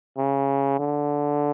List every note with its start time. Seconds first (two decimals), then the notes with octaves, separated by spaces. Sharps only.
0.18 C#3
0.79 D3